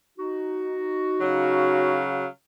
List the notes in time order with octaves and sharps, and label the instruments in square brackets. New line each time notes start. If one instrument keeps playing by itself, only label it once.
[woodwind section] D#4 F#4
[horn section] C#3 F#3 F5